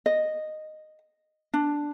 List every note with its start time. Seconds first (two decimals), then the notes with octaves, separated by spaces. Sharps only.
0.06 D#5
1.54 D4